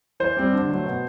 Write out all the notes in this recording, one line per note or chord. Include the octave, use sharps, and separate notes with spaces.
E3 C5
G3 C4
D3
F#3 A3
B2